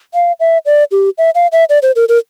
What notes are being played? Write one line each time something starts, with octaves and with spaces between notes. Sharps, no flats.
F5
E5
D5
G4
E5
F5
E5
D5
C5
A#4
A#4